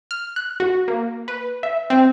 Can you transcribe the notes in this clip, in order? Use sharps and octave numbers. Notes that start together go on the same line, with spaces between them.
F6
F#6
F#4
A#3
B4
E5
C4